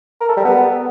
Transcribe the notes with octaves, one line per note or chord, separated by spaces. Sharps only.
A#4
A4
G3
B3